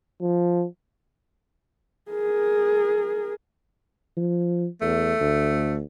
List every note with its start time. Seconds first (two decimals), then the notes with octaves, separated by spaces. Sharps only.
0.21 F3
2.11 G#4 A#4
4.17 F3
4.81 E2 A3
5.20 D2